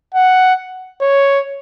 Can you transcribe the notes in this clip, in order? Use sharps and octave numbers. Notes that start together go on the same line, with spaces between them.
F#5
C#5